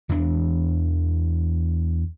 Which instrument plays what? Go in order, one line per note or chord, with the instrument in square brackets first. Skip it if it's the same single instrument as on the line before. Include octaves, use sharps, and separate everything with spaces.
[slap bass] E2 E3 A3 D4